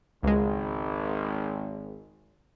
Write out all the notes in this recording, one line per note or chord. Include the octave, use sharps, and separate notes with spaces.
G#1 C#2 G#3